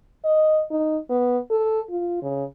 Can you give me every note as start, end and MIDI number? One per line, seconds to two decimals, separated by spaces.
0.24 0.62 75
0.71 0.98 63
1.10 1.38 59
1.50 1.80 69
1.90 2.21 65
2.22 2.44 49